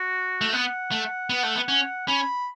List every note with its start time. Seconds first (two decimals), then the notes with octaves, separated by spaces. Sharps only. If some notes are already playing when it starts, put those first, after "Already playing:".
Already playing: F#4
0.41 A3
0.53 B3 F#5
0.91 A3
1.30 B3
1.43 A3
1.56 B3
1.68 C#4
2.08 C#4 B5